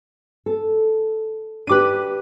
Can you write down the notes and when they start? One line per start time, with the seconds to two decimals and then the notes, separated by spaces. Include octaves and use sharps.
0.46 A4
1.67 D4 G4 B4 D6 D#7